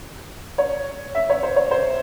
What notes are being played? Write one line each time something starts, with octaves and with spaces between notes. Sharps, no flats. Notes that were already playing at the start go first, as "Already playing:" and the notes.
C#5
E5
C#5
C5
C#5
C5